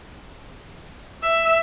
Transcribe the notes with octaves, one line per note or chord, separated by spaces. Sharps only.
E5